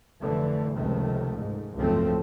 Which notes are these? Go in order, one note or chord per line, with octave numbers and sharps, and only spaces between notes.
F1 D3 E3 A3
F1 C#2 C3 D#3 A3
G#2
F#1 C#2 G#2 F3 A3 C4